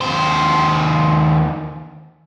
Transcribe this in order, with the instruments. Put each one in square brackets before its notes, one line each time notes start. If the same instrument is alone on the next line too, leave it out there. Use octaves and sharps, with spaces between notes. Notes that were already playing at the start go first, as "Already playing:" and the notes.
[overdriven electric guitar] D#2 C5